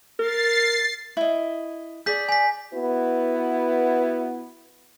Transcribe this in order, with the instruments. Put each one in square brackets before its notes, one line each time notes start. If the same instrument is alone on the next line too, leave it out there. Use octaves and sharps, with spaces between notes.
[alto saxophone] A#4 [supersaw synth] A6 C7
[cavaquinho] E4 D#5
[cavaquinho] G#4 D5 [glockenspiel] G6 B6
[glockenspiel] G#5 B6
[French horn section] B3 E4 F#4 B4